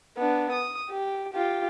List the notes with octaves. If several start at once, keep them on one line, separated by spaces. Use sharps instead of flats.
B3 D4
D#6
G4
F4 G4